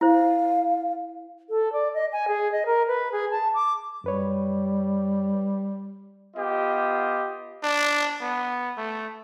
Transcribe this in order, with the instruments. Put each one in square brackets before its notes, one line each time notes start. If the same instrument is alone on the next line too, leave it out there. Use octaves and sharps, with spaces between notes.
[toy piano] E4 C5 [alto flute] F5
[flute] A4
D5
D#5
G#5
G#4
D#5
A#4
B4
G#4
A5
D6
[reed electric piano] F#2 B4 C#5 [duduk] G3
[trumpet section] B3 F4 G4 D#5
[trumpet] D4
B3
A3